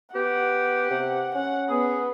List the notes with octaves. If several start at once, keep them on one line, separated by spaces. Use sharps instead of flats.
B3 G4 F#5
C3
C#4 F#5
B3 G#4